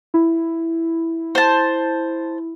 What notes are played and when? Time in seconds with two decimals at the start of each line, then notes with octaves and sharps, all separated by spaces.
0.14 E4
1.35 C5 A5